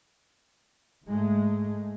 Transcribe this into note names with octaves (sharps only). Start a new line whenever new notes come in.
G#2 G#3 A3